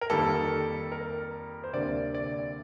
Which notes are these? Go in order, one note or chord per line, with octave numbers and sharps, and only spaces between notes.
A#4
F2 D#3 G3 A#3 A4
A#4
C5
D2 C3 G3 A#3 D5
D5